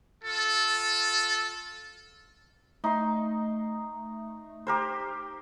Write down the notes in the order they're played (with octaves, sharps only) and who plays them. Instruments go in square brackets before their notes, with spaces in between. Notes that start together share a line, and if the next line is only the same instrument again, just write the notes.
[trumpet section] F4 A4
[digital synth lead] A3 [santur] D#4 C6
[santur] G4 A#4 C5